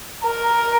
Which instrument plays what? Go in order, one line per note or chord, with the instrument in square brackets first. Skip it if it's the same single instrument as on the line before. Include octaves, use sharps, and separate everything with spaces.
[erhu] A#4